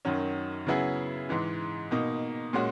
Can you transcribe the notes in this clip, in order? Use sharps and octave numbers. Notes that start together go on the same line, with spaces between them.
F#2 D#3 F#3 C#4
C#3 F#3 B3 E4 G#4
G#2 E3 G#3
B2 A#3 D#4
A#2 G#3 C#4 F#4